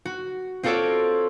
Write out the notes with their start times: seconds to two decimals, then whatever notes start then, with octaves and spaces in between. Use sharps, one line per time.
0.05 F#4
0.63 C4 F4 F#4 A4 C#5 D5